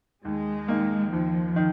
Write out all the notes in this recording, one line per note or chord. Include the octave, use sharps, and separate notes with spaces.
D#2 G#3
D#3 A#3
D#2 F3
D#3